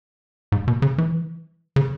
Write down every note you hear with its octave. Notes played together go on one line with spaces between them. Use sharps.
G#2
B2
C#3
E3
C#3